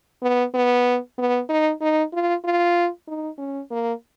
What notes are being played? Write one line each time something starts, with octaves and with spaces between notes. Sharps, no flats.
B3
B3
B3
D#4
D#4
F4
F4
D#4
C#4
A#3